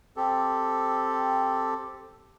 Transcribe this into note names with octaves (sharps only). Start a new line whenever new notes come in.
C4 G4 A4